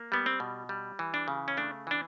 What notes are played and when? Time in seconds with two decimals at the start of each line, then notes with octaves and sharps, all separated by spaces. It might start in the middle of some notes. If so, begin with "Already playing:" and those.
Already playing: A#3
0.12 G3 B3
0.26 C4
0.40 B2
0.69 G3
0.99 E3
1.14 D4
1.28 C#3
1.48 C#4
1.57 A3 D4
1.87 E3 D4